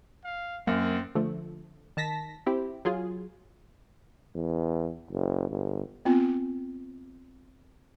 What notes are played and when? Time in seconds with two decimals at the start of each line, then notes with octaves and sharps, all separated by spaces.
0.24 F5
0.67 F#2 A#3 C4
1.15 D3 F3 A3
1.97 D#3 A5 A#6 B6
2.46 C4 E4 G4
2.85 F#3 F4 G#4
4.35 E2
5.11 F#1
5.50 G1
6.05 B3 C4 F4